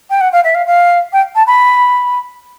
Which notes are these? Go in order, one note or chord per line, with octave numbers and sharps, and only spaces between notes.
G5
F#5
F5
E5
F5
F5
G5
A5
B5